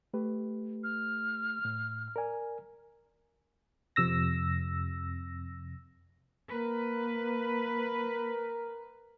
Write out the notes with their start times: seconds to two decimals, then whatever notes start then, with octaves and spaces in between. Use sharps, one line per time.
0.14 A3 G4 B4
0.84 F6
1.65 A2
2.16 A#4 D5 G#5
3.96 F2 C3 E6 A#6
6.51 A#3 A#4 B4